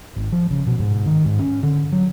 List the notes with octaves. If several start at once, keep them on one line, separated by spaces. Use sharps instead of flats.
G#1
F3
C#3
B2
G#2
D#3
G#2
C#4
D3
F#3